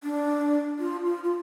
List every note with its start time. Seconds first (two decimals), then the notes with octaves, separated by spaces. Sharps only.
0.03 D4
0.79 F4
1.05 F4
1.24 F4